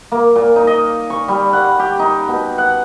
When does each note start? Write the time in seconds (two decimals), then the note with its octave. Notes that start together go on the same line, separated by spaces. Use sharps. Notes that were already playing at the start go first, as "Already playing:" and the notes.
0.12 A#3
0.36 A#2
0.56 D#4
0.67 D#5
1.10 C#6
1.28 G3
1.53 F#5
1.80 G4
1.99 D#4
2.28 B2
2.58 F#5